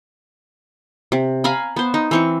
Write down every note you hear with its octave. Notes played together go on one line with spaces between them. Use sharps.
C3
F5 G#5 A#5 B5
B3 C5
D#4
E3 C4 C#6